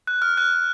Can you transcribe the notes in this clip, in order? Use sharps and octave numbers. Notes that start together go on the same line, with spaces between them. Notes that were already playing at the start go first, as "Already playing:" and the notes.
F#6
F6
F#6